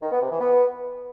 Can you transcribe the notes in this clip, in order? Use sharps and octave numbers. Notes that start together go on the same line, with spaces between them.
D#3
B3
C3
E3
B3